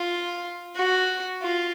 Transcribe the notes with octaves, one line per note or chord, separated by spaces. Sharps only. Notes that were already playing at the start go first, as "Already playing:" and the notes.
Already playing: F4
F#4
F4